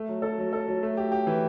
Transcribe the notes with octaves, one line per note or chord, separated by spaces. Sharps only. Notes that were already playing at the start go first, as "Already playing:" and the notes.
Already playing: A3
F#3
A4
F#3
A4
F#3
A3
G4
G4
E3